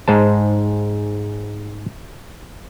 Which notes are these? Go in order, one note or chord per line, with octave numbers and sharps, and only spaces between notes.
G#2 G#3 C5 A5